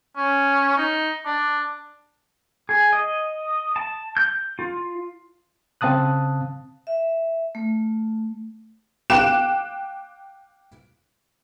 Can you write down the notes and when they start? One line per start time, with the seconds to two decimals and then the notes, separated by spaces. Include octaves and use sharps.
0.17 C#4
0.78 D#4
1.26 D4
2.69 G#4
2.93 D#5
3.76 A5
4.17 G6
4.59 F4
5.81 C#3 C4 F5 A5 D#6 F#6
6.87 E5
7.55 A3
9.10 F5 G5 D6 F#6 E7